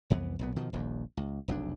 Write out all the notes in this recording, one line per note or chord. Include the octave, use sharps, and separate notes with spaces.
C2 F2 E3 B3
B1 A#2 B3
B2 D#3 F3
D#1 A#1 D#2
C#2
F1 B1 E2 D4